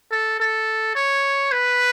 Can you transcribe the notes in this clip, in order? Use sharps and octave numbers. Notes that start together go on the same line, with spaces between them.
A4
A4
C#5
B4